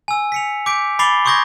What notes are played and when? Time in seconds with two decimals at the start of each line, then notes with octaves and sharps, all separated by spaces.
0.08 G#5 E6
0.32 B6 C#7 F7
0.66 D6 G6 B6 D7
0.99 B5 D6 A6 C7 F7 G7
1.25 C6 C#6 D#6 G6 G#6 A#6